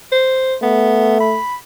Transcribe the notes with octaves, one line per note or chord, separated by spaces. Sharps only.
C5
A3 B3
B5